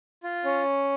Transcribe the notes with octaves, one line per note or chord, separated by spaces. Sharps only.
F4
C#4